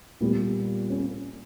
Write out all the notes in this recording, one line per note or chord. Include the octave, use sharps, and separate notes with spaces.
A#2 G3 B3
C#4